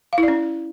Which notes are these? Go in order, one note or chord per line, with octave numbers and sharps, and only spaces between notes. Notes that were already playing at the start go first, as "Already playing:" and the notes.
F5
E4
D5
C#4